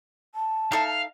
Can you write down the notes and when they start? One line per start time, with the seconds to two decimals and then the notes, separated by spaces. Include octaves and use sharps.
0.35 A5
0.72 D#4 A4 E5 F5